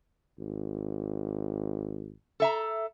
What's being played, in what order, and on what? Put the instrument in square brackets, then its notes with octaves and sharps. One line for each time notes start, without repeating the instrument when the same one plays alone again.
[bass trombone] G#1
[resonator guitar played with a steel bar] A4 E5 A#5